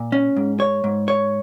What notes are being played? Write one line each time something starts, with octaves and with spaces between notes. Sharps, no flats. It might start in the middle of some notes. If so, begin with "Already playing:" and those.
Already playing: A#2
C#4
G#2
C#5
G#2
C#5